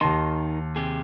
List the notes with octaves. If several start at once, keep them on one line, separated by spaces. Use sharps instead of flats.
D#2 D#3 D#4 A5 C6
C3 G4 G#4